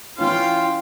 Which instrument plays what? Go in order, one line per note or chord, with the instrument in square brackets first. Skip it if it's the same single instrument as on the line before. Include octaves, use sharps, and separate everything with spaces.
[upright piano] E3 C#4 [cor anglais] F4 [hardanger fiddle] F5 G5